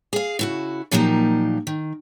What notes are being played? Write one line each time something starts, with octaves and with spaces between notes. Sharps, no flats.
G#4 F5
C#3 E4 F#4
A#2 F3 F#3 A#3 D#4 G4
D#3